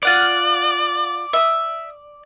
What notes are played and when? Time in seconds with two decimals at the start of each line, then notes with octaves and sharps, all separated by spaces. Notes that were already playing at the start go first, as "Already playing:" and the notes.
0.03 F4 D5 F#5 F6
1.33 E5 D#6